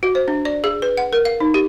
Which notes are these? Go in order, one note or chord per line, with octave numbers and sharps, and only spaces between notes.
F#4
C5
D4
D5
G#4
B4
F#5
A#4
F5
D#4
G4